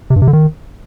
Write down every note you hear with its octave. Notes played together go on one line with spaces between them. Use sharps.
C3
G2
C3
D3
D#3